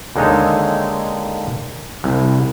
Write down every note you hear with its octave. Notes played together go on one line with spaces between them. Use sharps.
D#2 D3 G#3 D#4 A4 C#5
C2